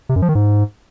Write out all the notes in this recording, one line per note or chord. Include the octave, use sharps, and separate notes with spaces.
C3
F#2
F3
D#3
G#2